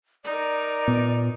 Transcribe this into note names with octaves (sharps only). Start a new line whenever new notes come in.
D#4 A#4 D5
A#2 B3